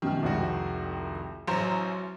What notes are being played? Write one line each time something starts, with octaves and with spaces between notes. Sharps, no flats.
F#2 B2 D#3 F6
C2 F2 G#3 F#4 E5
A1 F#3 C5 A#5